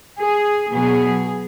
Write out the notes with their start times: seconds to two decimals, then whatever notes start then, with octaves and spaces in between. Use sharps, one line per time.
0.20 G#4
0.72 B2 F#3 B3 G#4